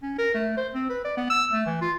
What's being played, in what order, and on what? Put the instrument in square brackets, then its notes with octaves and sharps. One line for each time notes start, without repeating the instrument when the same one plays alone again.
[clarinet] C#4
A#4
A3
C5
C4
B4
D5
B3
E6
A3
E3
F4